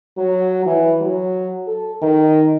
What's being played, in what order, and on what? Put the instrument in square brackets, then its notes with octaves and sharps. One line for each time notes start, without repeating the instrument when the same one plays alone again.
[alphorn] F#3
E3
F#3
A4
D#3